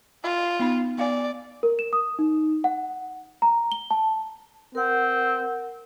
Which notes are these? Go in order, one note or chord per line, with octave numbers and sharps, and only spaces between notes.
F4
B3 D#4 B5
B3 D5 F5 G#5
A#4
E7
D#6
D#4
F#5
A#5
G7
A5
C4 A#4 F#5